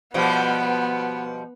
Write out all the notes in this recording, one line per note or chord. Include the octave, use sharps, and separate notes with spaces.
B2 F3 G3 B3